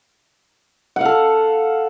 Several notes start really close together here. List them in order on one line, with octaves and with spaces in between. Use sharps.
F#5 F5 A4